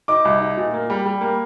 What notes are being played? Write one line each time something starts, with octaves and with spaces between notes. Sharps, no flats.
D#4 D6
C2
D#4
A#2
A#3
G3
G3
A#3